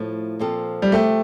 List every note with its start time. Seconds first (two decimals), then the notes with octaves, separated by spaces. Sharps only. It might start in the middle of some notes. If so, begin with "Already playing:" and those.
Already playing: A2 F3 A3
0.39 A#2 F3 C4 F4 A4
0.82 G3
0.92 C3 F3 A3 C4 G4